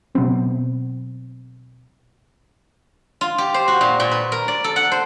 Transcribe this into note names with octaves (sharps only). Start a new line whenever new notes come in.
B2 F#3 B3 C4
F4
G4
C5
F#4
A#2
A#2
B4
A#4
D5
A4
F#5
C5